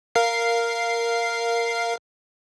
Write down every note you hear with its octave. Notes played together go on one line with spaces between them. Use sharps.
A#4 F5 C7